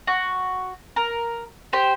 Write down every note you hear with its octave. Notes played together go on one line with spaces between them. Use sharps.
F#4
A#4
G4 C5 G5